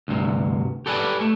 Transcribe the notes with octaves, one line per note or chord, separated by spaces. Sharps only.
D2 G2 C3
G4 A4 B4 D5 G5 G#5
A3